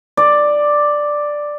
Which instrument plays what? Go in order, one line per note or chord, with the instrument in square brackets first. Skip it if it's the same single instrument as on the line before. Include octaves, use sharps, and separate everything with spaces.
[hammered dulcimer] D5